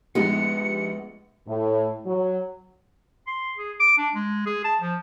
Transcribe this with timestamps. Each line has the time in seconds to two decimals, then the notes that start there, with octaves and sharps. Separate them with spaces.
0.15 A#1 G#3 B3 D#4 G4 C#7
1.47 A2
2.06 F#3
3.27 C6
3.58 G#4
3.80 D6
3.98 D4
4.15 G#3
4.46 G#4
4.64 A5
4.81 F3